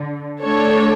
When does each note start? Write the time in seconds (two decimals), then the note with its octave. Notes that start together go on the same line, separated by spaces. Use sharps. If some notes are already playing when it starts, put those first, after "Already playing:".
Already playing: D3
0.41 D3 A3 D4 A4 C#5